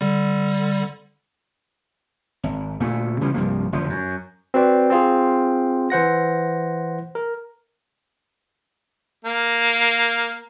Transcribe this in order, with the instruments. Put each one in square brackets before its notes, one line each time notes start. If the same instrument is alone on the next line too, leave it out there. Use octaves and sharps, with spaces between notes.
[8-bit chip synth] D3 G3
[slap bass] G#1
D2 A#2 A3
C#3 E3 F3 G3
C2 G2 F3 A#3
F1 D3 F3
F#2
[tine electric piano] C4 F#4 B4 D5
C4 F4 G#4
E3 C5 F#5 A#6
A#4
[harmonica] A#3